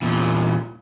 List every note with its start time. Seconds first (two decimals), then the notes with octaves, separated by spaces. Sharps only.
0.02 E2 A#2